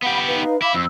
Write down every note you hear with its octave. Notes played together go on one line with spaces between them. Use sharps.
B3 G4 F5 F#5 B5
D#4 B4 F5
E4 F5 B5 D6
F2 E6